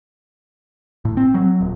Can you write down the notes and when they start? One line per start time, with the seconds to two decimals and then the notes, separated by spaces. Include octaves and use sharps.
1.05 A2
1.17 C4
1.34 F#3
1.61 D#1